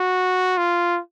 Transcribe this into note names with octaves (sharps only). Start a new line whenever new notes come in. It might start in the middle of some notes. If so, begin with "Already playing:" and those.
Already playing: F#4
F4